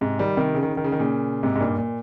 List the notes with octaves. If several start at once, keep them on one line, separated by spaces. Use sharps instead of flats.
G#2 C3
D#3 G3
C3 D#3
C#3
D#3
C#3
D#3
C#3
D#3
A#2 C#3
G#2 C3
G#2
G2 A#2
A#2